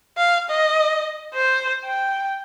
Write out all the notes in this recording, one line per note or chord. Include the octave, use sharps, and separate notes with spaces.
F5
D#5
C5
G5